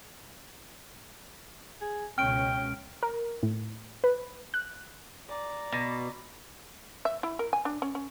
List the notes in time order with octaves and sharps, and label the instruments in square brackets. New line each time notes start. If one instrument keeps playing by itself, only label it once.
[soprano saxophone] G#4
[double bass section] C#2 B2 C#4 [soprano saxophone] G5 [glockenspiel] F6 D7
[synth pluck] A#4
A2
B4
F#6
[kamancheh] D5 A#5
[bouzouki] B2
[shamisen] E5
E4
A#4
G#5
D4
C#4
C#4